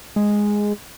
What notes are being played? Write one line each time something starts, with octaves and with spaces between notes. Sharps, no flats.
G#3